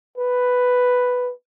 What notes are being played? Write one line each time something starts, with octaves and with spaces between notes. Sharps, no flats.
B4